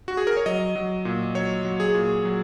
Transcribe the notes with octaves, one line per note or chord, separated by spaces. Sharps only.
F#4
G#4
A#4
C#5
F#3 D#5
F#3
A#2
F#3 C#5
F#3
G#4
A#2
F#3